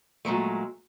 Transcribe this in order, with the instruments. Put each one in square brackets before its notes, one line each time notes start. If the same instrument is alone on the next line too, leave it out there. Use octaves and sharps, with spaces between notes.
[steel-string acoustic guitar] A#2 F#3 G#3 A3